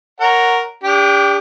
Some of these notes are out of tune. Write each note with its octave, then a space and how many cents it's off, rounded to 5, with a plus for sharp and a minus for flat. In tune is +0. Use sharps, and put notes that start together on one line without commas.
A#4 +0 C#5 +0 F#5 +0
D4 -20 G4 +40 G5 +0